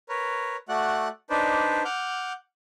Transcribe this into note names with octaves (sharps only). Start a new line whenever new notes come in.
A#4 B4 C#5
A3 F#4 D5 F#5 F#6
D4 D#4 B4 C5 D5
F#5 D6 F6 G6